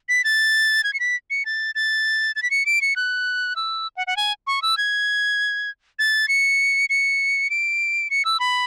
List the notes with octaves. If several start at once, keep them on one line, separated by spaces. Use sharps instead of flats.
B6
A6
G#6
C#7
B6
C#7
A6
A6
A6
B6
C#7
D7
C#7
F#6
E6
F#5
F#5
G#5
C#6
E6
G#6
A6
C#7
C#7
D7
C#7
E6
B5